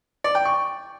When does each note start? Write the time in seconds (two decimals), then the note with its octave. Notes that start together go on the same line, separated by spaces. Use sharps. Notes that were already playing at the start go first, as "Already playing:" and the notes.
0.24 D5
0.35 G5
0.45 C#6